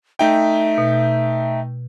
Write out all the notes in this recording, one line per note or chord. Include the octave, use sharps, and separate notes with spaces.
A3 D#4 E5 G5
B2